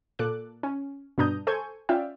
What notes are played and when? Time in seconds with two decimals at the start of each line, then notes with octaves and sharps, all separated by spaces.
0.19 A#2 A4 D6 F#6
0.63 C#4
1.18 G2 B2 D4 A#5 D#6 G6
1.47 A4 C5 G#5 C#6 G6 G#6
1.89 C#4 F4 D5 E5 F5 G5